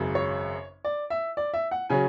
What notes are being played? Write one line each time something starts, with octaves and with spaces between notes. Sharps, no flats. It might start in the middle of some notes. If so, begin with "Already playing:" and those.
Already playing: G#1 F#2 C#3
C#5
D5
E5
D5
E5
F#5
C#3 F#3 C#4 G#5